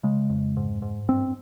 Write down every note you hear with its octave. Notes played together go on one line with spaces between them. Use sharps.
C#3 G#3
F2
G#2
G#2
G2 C4